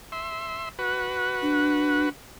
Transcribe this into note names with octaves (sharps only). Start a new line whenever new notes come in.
E5 C6
F#4 B4
D4